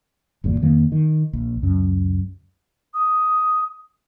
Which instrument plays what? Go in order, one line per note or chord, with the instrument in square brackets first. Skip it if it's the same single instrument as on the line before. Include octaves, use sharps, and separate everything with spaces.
[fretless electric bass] G1 E2 A#2
F2 D#3 A#3
D#3
A#1
C#2 F#2
[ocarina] D#6